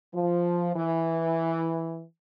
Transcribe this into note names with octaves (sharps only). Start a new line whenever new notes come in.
F3
E3